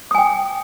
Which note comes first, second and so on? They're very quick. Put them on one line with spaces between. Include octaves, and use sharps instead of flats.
D#6 G#5 G5